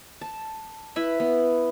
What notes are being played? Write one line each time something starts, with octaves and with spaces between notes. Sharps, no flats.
A5
E4 B4 E5 B5
B3